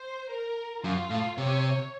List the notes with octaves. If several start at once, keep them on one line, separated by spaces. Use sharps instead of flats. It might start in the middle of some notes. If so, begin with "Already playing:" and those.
Already playing: C5
A#4
F#2 F4
A2
C3 C#5